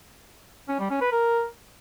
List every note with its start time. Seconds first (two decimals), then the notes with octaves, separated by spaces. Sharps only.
0.68 C#4
0.79 G3
0.90 C#4
1.01 B4
1.12 A#4